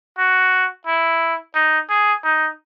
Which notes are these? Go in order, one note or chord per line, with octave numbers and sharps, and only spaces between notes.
F#4
E4
D#4
G#4
D#4